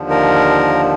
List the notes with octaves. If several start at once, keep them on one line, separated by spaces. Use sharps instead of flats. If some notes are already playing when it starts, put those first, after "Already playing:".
Already playing: D#2 D3 F3
A#4